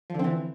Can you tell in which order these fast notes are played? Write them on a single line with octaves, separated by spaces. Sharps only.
F3 D3 C4 E3